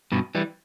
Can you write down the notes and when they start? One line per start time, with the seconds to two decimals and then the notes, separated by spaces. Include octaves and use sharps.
0.12 G2 B2
0.35 E3 G3